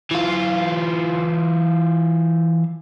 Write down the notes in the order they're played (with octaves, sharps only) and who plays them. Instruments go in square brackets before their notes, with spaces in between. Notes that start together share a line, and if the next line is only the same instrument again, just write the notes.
[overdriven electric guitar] E3 F4